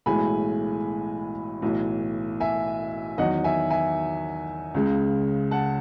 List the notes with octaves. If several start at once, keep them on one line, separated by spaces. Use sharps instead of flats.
B1 A2 E3 G#3 G#5 B5
B1 A2 E3
E5 G#5
E2 D#3 F#3 D#5 F#5
E5 G#5
E5 G#5
C#2 C#3 G#3
F#5 A5